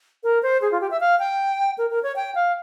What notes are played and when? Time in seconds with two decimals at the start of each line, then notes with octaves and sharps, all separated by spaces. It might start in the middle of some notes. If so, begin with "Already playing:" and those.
0.23 A#4
0.43 C5
0.62 G#4
0.72 F4
0.81 G4
0.91 E5
1.00 F5
1.19 G5
1.78 A#4
1.90 A#4
2.03 C#5
2.16 G5
2.35 F5